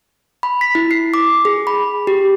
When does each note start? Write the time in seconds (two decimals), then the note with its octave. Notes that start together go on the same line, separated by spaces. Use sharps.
0.43 B5
0.61 B6
0.75 E4
0.91 C7
1.14 D6
1.45 G#4
1.67 B5
2.07 G4